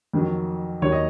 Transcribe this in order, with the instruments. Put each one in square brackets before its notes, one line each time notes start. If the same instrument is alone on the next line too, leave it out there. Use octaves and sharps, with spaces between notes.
[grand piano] F2 D#3 F#3
D#2 D#3 F#3 C#5
D#5